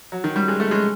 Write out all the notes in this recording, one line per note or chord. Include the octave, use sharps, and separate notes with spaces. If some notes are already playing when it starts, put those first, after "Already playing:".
F#3
D#3
G3
G#3
A3
G#3